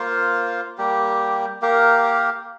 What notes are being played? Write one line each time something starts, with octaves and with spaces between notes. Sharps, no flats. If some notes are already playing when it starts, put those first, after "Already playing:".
Already playing: A#3 F4 C5 F5
G3 A#3 G4
A#3 G4 A#4 F5